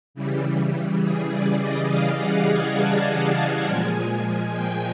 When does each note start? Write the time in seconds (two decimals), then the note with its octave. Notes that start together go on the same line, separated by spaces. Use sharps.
0.14 C#3 E3 G3
1.02 G#4
1.32 D5
1.60 D#5
1.90 F5
2.19 F#5
2.49 G#5
2.78 A5
3.66 A#2 F3 G#3 G#5
4.54 G5